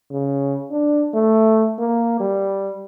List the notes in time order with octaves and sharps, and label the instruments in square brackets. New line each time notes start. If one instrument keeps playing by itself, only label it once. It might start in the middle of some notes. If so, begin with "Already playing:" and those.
[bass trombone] C#3
D4
A3
A#3
G3